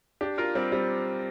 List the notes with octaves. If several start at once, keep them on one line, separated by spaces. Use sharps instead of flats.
D4 G4
F4 A#4
G3 C4
G3 C4